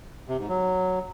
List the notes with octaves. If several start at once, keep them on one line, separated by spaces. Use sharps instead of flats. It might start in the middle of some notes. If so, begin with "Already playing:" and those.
C3
G#2
F#3